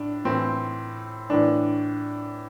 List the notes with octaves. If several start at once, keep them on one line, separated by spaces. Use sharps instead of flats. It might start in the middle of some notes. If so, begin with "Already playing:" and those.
Already playing: A2 D4
A2 E3 C4
A2 E3 D4